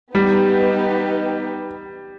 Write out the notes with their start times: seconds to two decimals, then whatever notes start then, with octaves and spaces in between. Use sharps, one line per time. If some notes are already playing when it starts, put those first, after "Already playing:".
0.14 G3 B3 D#4 G4 B4